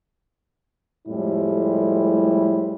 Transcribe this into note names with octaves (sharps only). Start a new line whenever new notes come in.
F2 A2 G3 G#3 E4